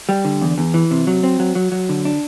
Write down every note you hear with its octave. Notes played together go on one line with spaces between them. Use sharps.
G3
D3
E2
E2
E3
C3
F#3
C4
F#3
F#3
F#3
D3
D4